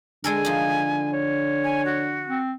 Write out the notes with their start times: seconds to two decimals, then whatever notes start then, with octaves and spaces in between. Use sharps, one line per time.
0.24 D3 G#3 A4 A#4 G#5
0.45 F3 D#4
1.13 C#5
1.64 G#5
1.85 F#4
2.27 C4